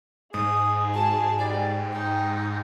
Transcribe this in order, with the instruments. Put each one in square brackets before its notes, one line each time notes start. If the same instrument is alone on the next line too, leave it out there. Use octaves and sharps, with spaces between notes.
[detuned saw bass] G#2 [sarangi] G#4 [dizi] D#6
[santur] F#4 [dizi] A5
[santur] G3 D#4 G4 [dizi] D5
[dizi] D#4 [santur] G5 C6